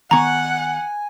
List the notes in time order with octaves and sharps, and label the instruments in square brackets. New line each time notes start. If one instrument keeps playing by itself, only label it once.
[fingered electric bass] D#3 B3 [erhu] F#5 [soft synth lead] G#5 [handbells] A#5 C#6